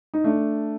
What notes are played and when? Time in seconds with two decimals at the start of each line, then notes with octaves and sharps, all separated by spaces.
0.14 D#4
0.24 A3 D4